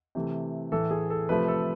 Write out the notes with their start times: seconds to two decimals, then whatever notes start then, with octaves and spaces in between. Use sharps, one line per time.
0.15 C3 E3 A3
0.72 A2 E3 A3 A4
0.91 G#4
1.10 A4
1.29 C3 F3 A3 B4
1.48 A4